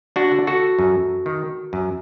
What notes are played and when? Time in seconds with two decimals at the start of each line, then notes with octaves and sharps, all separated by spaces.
0.16 D4 F#4
0.32 D3
0.47 F#4 A4
0.79 F#2
1.26 D#3
1.73 F#2